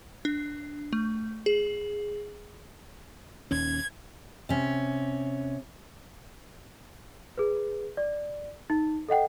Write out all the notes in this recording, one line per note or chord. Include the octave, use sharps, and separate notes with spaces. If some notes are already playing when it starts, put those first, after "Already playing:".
D4
A3
G#4
D#1 D#2 C#4 G#6
C3 C#4
G#4 B4
D5
D#4
A4 D#5 F#5 G5